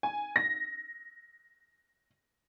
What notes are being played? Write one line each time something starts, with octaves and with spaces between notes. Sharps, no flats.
G#5
A#6